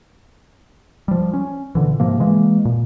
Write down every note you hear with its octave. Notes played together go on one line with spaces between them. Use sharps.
F3 G3
C#4
A#2 D3 E3
G#2 C3 F3 A#3
E3 G#3 A#3
A#2